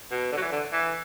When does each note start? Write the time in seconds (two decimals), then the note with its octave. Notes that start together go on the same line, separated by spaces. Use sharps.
0.11 B2
0.32 D3
0.37 F#3
0.42 E3
0.52 D3
0.72 E3